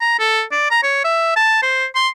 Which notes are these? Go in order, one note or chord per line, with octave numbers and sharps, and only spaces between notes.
A#5
A4
D5
A#5
C#5
E5
A5
C5
C6